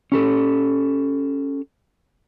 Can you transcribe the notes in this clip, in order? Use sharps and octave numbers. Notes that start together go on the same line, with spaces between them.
C#4 G4 A4